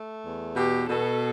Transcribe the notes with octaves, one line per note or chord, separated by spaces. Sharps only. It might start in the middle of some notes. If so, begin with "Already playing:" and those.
Already playing: A3
E2
B2 G4
B2 A4